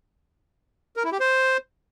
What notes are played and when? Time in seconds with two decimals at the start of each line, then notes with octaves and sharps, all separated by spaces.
0.96 A#4
1.04 E4
1.12 G4
1.20 C5